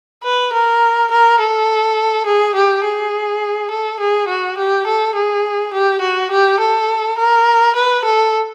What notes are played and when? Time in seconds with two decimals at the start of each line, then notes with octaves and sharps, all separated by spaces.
0.24 B4
0.53 A#4
1.11 A#4
1.40 A4
2.26 G#4
2.55 G4
2.85 G#4
3.71 A4
4.00 G#4
4.28 F#4
4.58 G4
4.87 A4
5.15 G#4
5.73 G4
6.02 F#4
6.31 G4
6.60 A4
7.18 A#4
7.76 B4
8.05 A4